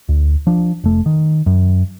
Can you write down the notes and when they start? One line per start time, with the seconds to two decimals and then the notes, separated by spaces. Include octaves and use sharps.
0.09 D2
0.47 F3 D4
0.84 F1 A3
1.06 D#3
1.46 F#2